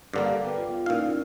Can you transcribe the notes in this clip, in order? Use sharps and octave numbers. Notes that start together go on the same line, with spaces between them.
G2 D3 A#3 A4 F5 D6
B3 B4 G5
F4
A#2 C#4 D#4 E4 F5